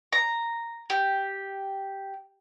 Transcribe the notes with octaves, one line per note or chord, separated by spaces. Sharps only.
A#5
G4